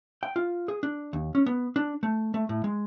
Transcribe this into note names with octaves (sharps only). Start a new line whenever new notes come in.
G5
F4
G#4
D4
D#2
C#4
B3
D4
A3
A3
A2
G#3